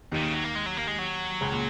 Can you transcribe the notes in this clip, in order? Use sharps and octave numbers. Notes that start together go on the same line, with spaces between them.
D#2 A#2 D#3
C#3
F#3
A#3
G#3
F#3
A#3
G#3
F#3
C#2 C#3
A#2